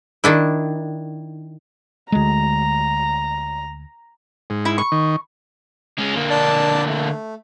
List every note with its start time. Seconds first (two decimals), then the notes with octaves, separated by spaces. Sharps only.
0.24 D#3 D4 E4
2.12 D2 G#3 A#5
4.50 G#2
4.65 E4
4.78 C#6
4.92 D#3
5.98 G#3 C#4
6.16 D3 A#3
6.30 D4 D5 A5
6.87 A3